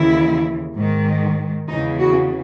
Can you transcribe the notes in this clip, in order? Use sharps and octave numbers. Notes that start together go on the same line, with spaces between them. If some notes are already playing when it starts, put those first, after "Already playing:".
Already playing: D#2 C#3 E3 E4
G#2 D#3
E2 C#3 E3 D#4
F#4